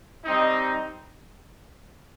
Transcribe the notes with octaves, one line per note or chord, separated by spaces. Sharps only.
G3 C4 D#4